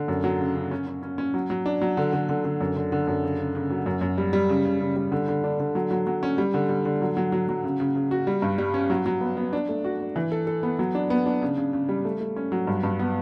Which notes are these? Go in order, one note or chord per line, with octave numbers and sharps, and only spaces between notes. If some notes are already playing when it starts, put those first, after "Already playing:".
Already playing: D3
F#2
F#3
C#3
C#3
C#4
C#4
C#4
C#4
F#3
F#3
D4
F#3
D3
D3
D3
D3
F#2
D3
D3
F#2
C#3
C#3
C#3
F#3
F#2
F#2
G3
G3
C#3
C#3
C#3
G3
D3
D3
D4
D3
F#3
F#3
F#3
C#4
G3
D3
G3
D3
F#3
F#3
F#3
F#3
C#3
C#3
C#3
F#4
G3
G2
G3
C#4
F#3
F#3
B3
B3
D4
A3
F#4
D4
E3
A4
A4
B3
F#3
D4
B3
D4
C#3
C#3
C#3
G3
A3
A3
C#4
F#3
G2
G2
B3